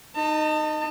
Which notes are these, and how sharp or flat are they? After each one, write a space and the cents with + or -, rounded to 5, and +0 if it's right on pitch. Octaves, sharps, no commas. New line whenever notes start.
D#4 -15 A5 +35